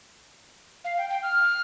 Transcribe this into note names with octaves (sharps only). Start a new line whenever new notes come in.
F5
G5
G5
F6